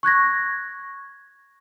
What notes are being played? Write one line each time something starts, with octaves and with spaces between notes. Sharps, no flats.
C#6 F#6 G#6 A#6